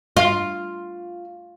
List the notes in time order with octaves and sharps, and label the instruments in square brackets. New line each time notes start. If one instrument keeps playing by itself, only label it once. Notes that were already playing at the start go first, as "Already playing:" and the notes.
[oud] F4